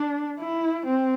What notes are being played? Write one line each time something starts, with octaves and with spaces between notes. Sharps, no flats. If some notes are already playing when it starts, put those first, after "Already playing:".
Already playing: D4
E4
C4